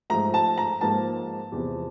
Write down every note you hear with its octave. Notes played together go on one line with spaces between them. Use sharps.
G#2 F3 A3 A#5
A5
A#5
G#2 F3 A#3 A5
E2 C3 F3